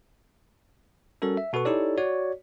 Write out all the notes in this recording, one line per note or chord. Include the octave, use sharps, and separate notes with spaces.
G3 C#4 F#4 A4 A#4
E5
B2 F#4 A4 B4 C#6
D#4 E4 G4 A4 C#5 D5
F#4 C#5 D5